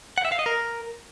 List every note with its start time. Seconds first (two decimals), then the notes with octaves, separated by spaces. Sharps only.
0.18 F#5
0.25 E5
0.32 F5
0.39 D#5
0.46 A#4